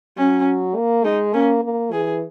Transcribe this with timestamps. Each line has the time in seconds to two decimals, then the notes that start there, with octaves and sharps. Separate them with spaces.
0.17 F#3 C#4
0.76 A#3
1.04 G#3 D#4
1.34 A#3 C#4
1.63 A#3
1.92 E3 G#4